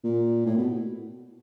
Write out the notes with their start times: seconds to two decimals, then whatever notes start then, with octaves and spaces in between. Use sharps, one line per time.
0.04 A#2
0.46 A2
0.57 B2